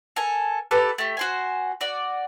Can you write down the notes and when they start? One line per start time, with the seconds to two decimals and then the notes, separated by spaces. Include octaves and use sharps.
0.16 A4 A#4 G#5
0.71 G4 A4 B4
0.98 A3 G4
1.17 F#4 C5 G#5
1.81 F#4 D5